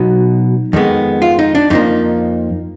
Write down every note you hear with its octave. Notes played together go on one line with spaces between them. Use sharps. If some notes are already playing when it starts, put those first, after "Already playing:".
Already playing: B2 F#3 B3 D#4
F2 D#3 G#3 B3
F4
D#4
D4
F2 F3 A#3 D#4